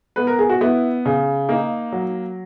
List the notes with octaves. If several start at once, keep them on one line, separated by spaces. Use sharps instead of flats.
B3 B4
A#4
G#4
F#4
B3 E4
C#3
A#3 D#4
F#3